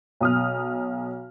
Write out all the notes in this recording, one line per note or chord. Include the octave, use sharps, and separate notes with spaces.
B1 D#6 F6